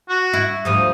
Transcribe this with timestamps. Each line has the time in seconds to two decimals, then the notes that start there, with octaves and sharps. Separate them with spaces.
0.09 F#4
0.33 E4
0.65 D2 F3 G3 D#6